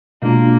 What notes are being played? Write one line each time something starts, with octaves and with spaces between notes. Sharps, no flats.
B2 G#3 A#3 D4 F4